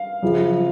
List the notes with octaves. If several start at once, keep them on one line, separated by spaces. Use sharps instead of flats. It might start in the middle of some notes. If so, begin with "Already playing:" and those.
Already playing: F5
F#2 C#3 F3